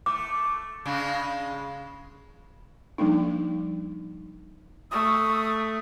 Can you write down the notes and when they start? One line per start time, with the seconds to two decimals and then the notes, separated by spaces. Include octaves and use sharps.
0.06 A3 D6
0.85 C#3 G#3 D4
2.98 F3 G3 A#3 D4 D#4
4.91 A3 C#6 D#6 E6